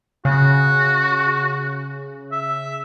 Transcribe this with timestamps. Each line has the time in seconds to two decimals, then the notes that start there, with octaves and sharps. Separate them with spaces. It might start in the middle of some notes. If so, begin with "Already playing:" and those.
0.25 C#3 F#4
2.32 E5